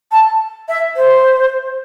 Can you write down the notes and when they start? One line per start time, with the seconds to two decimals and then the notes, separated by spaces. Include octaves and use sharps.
0.12 A5
0.68 E5
0.96 C5